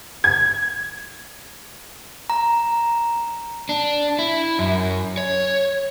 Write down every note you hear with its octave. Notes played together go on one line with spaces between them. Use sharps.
G#6
A#5
D4
E4
F#2
C#5